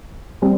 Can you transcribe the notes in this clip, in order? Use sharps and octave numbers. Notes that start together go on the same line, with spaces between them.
G3 C4